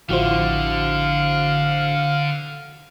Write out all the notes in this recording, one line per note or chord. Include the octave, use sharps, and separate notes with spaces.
A1 D3 F3 E4 F#4 C5 F5